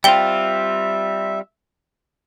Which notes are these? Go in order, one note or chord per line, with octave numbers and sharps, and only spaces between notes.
G3 C4 F4 E5 G5 G7